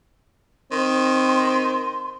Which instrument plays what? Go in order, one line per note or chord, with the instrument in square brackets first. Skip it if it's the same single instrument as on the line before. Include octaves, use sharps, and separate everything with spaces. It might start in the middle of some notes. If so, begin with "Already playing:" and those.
[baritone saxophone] D#3 [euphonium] C4 [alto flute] C6